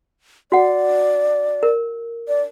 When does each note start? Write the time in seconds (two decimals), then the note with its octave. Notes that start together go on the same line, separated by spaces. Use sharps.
0.52 F#4 D5 F#5
1.63 A#4
2.28 D5